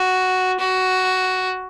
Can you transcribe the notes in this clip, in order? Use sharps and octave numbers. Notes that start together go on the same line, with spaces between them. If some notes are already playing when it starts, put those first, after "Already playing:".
Already playing: F#4
F#4